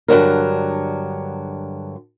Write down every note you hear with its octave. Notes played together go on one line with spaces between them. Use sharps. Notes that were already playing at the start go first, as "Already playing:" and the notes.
G2 D3 F#3 A#4